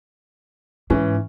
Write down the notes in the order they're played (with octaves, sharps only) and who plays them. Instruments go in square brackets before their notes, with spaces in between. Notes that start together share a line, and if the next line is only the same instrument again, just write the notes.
[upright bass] G#2 [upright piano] E3 C#4